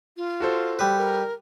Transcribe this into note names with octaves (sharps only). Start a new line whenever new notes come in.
F4
F#4 A4 C5
G3 B4
A#4